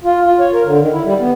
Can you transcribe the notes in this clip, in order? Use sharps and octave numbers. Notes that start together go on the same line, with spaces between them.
F4
F4
C#5
A#4
D3
D#3
E4
G3
B3